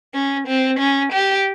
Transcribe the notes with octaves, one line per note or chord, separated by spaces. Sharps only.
C#4
C4
C#4
G4